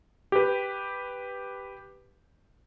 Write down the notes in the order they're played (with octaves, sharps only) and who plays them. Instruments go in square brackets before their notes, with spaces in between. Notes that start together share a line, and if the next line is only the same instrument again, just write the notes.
[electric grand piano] G4 B4